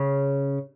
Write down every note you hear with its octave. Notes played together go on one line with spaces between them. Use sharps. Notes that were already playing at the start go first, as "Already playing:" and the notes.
Already playing: C#3